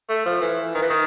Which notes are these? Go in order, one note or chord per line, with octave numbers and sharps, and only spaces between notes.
A3
F3
E3
D#3
E3
D#3